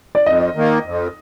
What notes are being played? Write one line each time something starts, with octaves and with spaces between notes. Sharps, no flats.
D5
F2 D#5
D#3 A#3
F2